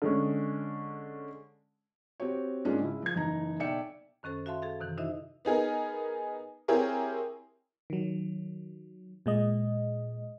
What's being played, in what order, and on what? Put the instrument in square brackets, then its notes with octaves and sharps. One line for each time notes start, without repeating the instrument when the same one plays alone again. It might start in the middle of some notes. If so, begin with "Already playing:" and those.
[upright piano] D3 G#3 C#4
[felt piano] C4 F#4 G4 C#5
G#2 G#3 A#3 C#4 D4 F4
C#2 E4
F3 G#6
F#1 E3 D#4 A#5
B1 D5 E5 G5 C#7
[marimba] F#2 D#3 C#4 A4 C5
F#4 E5 F5 A5 C6
G#4 A4 F5
F#2 C3 D#3 E3
D#4 E4 F#4 C5 D#5 E5
[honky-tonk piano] B3 D#4 G#4 A#4
C4 E4 G4 G#4 A#4 C#5
[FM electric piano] D#3 F#3
A#2 G#3 D#5